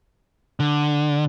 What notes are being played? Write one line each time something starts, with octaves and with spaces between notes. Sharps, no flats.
D3